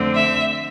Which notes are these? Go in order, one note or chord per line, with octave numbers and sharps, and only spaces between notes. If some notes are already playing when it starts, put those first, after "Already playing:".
Already playing: F2 D3 A3 C4
E5